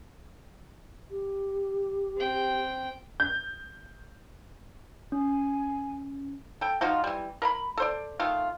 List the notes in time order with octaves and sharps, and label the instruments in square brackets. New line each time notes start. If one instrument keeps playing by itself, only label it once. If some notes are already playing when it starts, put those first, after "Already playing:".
[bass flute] G4
[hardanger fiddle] C4 G5
[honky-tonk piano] G6
[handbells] C#4 [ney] G#5
[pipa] A4 G5
F3 D#4 F4 F#4
E3 G3
A#4 A#5 B5
A4 C5 D5
D#3 A3 F4